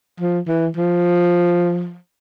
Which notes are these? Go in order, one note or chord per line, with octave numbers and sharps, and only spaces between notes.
F3
E3
F3